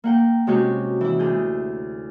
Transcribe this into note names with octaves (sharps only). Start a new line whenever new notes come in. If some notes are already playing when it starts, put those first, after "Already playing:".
A#3 F#5 G5
C3 G#3 C#4 F#4 G4 G6
E3 E4
D2 G#4 G6